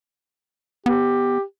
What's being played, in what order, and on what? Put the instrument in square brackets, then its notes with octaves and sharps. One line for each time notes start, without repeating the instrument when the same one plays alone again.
[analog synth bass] B3 [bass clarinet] G4